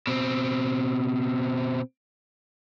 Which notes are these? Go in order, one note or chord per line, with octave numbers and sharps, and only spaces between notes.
B2 C4